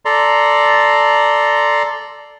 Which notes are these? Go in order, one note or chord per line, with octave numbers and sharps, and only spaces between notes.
A4 D5 A#5 C6